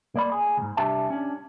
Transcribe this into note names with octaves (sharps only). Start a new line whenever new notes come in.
A#3 D5 B5
G#4
D2 G#2
C2 D4 G4 E5 A5
C#4 D4